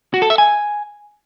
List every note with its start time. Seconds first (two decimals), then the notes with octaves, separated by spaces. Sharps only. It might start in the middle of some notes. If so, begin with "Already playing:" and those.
0.14 F#4
0.22 A4
0.30 E5
0.38 G#5